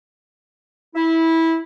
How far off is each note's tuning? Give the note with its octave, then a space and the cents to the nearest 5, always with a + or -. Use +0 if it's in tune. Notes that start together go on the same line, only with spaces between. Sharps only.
E4 -15